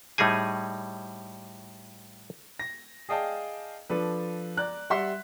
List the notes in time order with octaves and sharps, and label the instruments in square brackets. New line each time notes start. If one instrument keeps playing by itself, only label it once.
[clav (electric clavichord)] A2 G3 D#4 G#4 G#5
[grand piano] A#6
G#4 D5 D#5 F5 G5 A5
F3 D4 A4 B4
D5 A#5 F#6
G3 E5 F#5 C6 B6